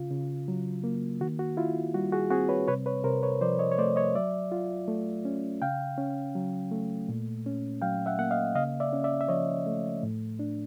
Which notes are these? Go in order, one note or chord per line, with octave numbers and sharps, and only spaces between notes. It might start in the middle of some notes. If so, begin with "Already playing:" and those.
Already playing: C#3 F4
C#3
F#3
A#3
D#3 F#4
F#4
E4 F4
G3 F#4
F#4 G#4
C4 F#4 G#4
B4 C#5
C3 B4 C#5
B4 C#5
C3 A#4 C5
B4 C#5
F3 C5 D5
C#5 D#5
C#5
A3 C5 D5
C#5 D#5
F#3 D5 E5
F4
A3
C#4
C#3 F5 G5
C#4
F#3
A3
A#2
C#4
F#3 F5 G5
E5 F#5
A#3 F#5
D#5 F5
C#3 D#5 F5
D5 E5
C#4
D5 E5
E5
F3 C#5 D#5
A3
A2
D4